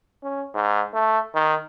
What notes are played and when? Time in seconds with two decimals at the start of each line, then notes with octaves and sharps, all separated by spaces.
0.23 C#4
0.54 G#2
0.94 A3
1.34 D#3